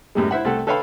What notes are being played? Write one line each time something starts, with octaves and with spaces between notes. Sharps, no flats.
F#2 A2 G3 G#3
E4 C5 E5 F#5
C2 A3 A4 F#5
A4 B4 C#5 F5 G5 B5